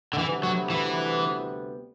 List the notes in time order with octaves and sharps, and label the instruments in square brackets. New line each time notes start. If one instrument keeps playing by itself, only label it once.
[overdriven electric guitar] D3
[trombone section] D2 C3 G3 B3 [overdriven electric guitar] E3
[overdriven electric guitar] F#3
E3